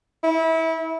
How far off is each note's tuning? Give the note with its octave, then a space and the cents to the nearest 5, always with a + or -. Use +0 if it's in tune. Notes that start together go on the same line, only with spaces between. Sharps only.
E4 -25